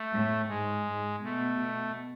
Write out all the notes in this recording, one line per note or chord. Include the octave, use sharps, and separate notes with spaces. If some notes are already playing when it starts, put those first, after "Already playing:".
Already playing: A3
A2
G#2 G#3
G#2
B2 A3
B2